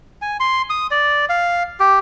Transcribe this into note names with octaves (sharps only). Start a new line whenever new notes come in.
G#5
C6
D#6
D5
F5
G4